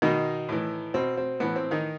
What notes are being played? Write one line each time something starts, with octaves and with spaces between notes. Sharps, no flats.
B2 D#3 D#4
A2 E3
B2 C4
C4
A2 E3 B3
C4
D#3 D#4